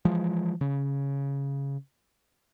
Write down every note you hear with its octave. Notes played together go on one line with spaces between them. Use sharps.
E3 F3 G#3
C#3